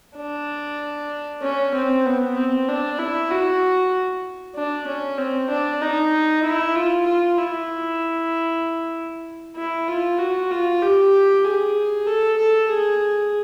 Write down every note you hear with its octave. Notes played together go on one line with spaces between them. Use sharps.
D4
C#4
C4
B3
C4
D4
E4
F#4
D4
C#4
C4
D4
D#4
E4
F4
F4
E4
E4
F4
F#4
F4
G4
G#4
A4
A4
G#4